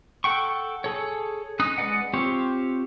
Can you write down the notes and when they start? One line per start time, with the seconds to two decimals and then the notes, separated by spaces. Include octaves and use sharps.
0.24 A4 F#5 G5 C#6
0.84 G#4 A4 C#5
1.60 C#4 D#4 D#6 F#6
1.78 G#3 B4 D5 D#5 F#5
2.14 C4 F4 G4 C#5